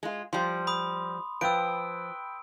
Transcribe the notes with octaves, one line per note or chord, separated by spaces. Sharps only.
G#3 F4
F3 G3 C6
B5 D#6
F3 B4 G5 E6 D7